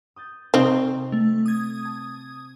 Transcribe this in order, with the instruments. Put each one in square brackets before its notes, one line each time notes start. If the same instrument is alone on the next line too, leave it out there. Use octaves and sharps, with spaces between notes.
[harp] D#6 G6 A6
[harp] C3 C#6 [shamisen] C4 D#4
[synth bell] A3
D#6 G#6
[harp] A5